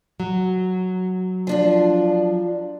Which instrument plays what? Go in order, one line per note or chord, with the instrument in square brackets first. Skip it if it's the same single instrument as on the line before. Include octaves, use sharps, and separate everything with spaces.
[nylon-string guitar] F#3
[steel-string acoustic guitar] F3 D4 F4